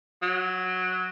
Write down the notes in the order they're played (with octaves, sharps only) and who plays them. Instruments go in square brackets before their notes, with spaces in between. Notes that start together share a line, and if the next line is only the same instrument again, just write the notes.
[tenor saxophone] F#3